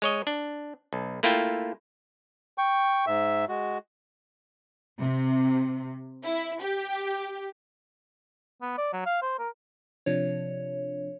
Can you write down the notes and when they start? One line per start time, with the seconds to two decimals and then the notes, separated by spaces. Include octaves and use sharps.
0.02 G#3 C#5 D#5
0.27 D4
0.93 B1
1.23 A3 A#3 E4 F4 G5
2.58 G5 C#6
3.07 G#2 E5
3.49 G#3 F#4
4.99 C3
6.24 E4
6.61 G4
8.62 B3
8.78 D5
8.93 F#3
9.06 F5
9.22 C5
9.39 A#4
10.06 C3 F3 D4 C#5